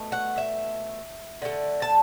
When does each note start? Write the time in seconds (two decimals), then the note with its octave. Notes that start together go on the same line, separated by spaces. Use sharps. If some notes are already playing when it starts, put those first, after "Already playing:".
Already playing: B2 A3
0.12 F#5
0.38 E5
1.42 D3 A3
1.82 A5